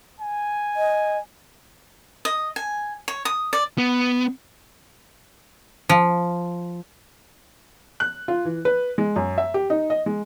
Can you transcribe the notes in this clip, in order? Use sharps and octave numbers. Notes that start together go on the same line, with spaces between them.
G#5
D#5
D#5
G#5
C#5
D#6
D5
B3
F3
F#6
F4
E3
B4
G#3
F#2
E5
G4
D#4
D#5
G#3